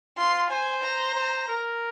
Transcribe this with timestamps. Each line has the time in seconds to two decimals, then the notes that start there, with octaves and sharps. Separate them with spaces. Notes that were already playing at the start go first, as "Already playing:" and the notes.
0.17 F4 C6
0.50 C5 G#5
0.83 A#5
1.15 C5
1.48 A#4